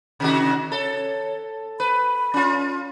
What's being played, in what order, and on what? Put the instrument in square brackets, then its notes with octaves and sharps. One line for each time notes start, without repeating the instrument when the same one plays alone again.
[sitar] C3 D#3 F#4
[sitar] A4 [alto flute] C#5
[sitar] B4 [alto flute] B5
[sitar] C#4 F4